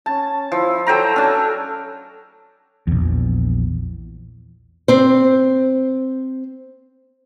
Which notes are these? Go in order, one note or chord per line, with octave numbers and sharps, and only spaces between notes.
C#4 A5
F3 E4
F#3 A4 G5 A#5
C#4 D4
A#1 E2
C4 C5